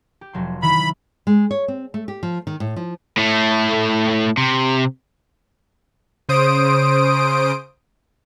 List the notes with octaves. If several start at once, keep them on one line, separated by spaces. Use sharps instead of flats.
G4
F1 F#3 C6
D#3 E3 E4 B5
G#3
C#5
C4
A3
G4
F3
D#3
A2
F3
A2 A3
C3
C#3 C5 D#6 D7